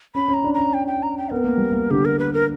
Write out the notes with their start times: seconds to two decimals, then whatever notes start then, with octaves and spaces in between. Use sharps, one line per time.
0.15 C#4 B5
0.28 C#4
0.34 A#5
0.44 D4
0.54 C#4 A#5
0.73 G5
0.87 G5
1.02 A#5
1.17 G5
1.31 B3 A#4
1.44 A#3
1.57 G3
1.72 A#3
1.91 D3 G4
2.05 A#4
2.19 B4
2.33 A#4